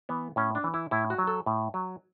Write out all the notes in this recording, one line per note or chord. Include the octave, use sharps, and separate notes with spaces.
E3 B3
A2 C#4
D4
E3
E4
A2 E4
F#4
F#3
A4
A2
F#3